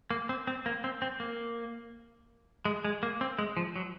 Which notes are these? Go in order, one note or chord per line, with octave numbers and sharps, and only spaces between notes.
A#3
C4
C4
A#3
C4
C4
A#3
G#3
G#3
A#3
C4
G#3
F3
F#3